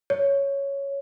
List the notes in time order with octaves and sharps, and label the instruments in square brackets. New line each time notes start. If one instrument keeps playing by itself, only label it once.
[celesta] C#5